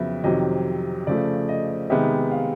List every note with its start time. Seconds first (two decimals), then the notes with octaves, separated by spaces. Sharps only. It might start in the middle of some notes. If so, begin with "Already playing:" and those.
Already playing: F2 C#3 F#3 B3 E5
0.24 F2 C3 D#3 F#3 D#5
1.07 C#3 F3 A3 D5
1.49 D#5
1.90 C3 D#3 G#3 B3 E5
2.31 F5